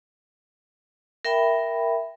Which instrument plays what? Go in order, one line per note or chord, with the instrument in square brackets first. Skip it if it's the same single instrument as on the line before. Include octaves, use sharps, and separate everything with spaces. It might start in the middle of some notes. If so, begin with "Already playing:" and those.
[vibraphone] A#4 E5 G5 B5